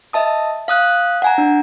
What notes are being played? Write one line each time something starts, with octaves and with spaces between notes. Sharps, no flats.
D#5 E5 A5 D#6
F5 D#6 F#6
F#5 G#5 A#5
D4